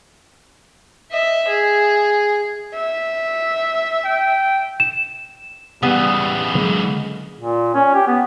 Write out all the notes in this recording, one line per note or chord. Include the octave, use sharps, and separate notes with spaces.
D#5 E5
G#4
E5
G5
E7
C#3 E3 G3 B3
D3 F#3 G#3 A#3
A#2
C#4
G4
B3